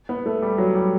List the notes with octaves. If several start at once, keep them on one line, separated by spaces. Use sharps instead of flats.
B3
A3
G3
F#3
G3